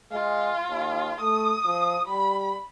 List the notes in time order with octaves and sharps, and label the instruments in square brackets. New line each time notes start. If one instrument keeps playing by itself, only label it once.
[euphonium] G#3 [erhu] F4
[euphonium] D#2
[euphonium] A3 [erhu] D#6
[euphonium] F3
[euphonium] G3 [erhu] B5